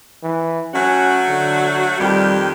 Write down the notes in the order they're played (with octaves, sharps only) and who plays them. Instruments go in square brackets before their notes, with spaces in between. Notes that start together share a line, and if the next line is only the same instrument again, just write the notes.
[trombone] E3
[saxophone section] F#3 A3 F#4 [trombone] C#4
[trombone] D3
[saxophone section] F2 D#3 G4 [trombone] G3